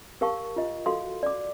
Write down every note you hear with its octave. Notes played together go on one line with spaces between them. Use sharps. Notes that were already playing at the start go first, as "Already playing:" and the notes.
G4 A#4 F5 A5 C#6
F4 D#5
F#4 A4 F5 C6
D5 D6